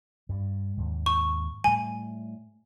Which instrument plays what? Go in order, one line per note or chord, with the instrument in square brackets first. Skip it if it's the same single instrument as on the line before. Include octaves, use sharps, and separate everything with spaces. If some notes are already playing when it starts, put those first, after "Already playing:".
[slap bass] G2 G3
D#2 G#2
[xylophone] C#6
[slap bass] A2 G3 [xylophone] G#5